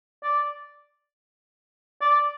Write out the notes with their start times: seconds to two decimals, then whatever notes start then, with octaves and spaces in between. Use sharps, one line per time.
0.23 D5
2.01 D5